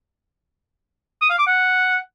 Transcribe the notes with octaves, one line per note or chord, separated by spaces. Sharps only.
D#6
F5
D6
F#5